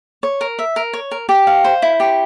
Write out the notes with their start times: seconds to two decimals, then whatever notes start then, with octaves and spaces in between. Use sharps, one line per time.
0.23 C#5
0.41 A#4
0.59 E5
0.76 A#4
0.93 C#5
1.11 A#4
1.29 G4
1.47 F5
1.64 C5
1.82 E4
2.00 G4